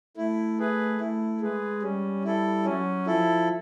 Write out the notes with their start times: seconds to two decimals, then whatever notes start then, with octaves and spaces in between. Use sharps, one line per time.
0.17 A3 E4
0.59 G#4 B4
1.00 A3 E4
1.41 G#3 G#4 B4
1.82 G3 C#4
2.25 E4 A4
2.65 F#3 C#4
3.07 F3 E4 A4